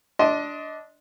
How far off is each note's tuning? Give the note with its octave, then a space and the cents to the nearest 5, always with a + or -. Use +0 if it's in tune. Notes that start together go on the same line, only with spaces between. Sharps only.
D4 -5 D#5 +25 C6 +0